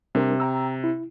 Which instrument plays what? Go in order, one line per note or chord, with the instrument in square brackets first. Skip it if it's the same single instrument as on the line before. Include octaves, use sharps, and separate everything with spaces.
[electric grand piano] C3 [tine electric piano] G3 D4 A#4
[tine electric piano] G5 A#5 E6
E4